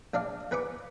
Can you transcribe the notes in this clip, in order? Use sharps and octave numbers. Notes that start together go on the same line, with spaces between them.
A#1 D4 D5 F5
E2 B4 B5 C#6 D6